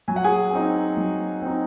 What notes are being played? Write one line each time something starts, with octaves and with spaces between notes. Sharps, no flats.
F#3 G#5
F#5
G#4 G#5
C4 D#4
F#3
C4 D#4